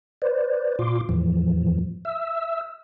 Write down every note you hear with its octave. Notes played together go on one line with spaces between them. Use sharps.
B4 C5 D5
A#2 F4 C6 D6
E2 A2 E3 F3
E5 E6